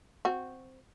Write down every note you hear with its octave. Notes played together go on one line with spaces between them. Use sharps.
C4 F#4